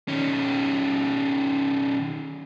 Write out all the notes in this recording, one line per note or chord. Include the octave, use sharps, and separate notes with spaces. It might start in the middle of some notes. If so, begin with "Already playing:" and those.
D#3 C#4